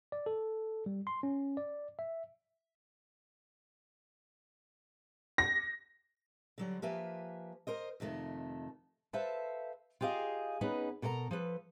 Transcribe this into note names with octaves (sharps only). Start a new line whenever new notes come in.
D5
A4
G3
C6
C#4
D5
E5
A#6
D3 F#3 G3
F3 A#3 G4 B4 E5 G#5
A#4 C5 D#5
F2 C3 D#3 A3
A4 B4 C5 E5 F5 A5
F4 G4 G#4 D#5 F5
B3 C#4 D#4 G#4 B4
B2 A4 A#4 D#5 A#5
F3 A4 B4